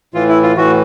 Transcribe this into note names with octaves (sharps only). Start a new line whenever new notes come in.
A2 E3 F4
E4
F4
A2 E3 F#4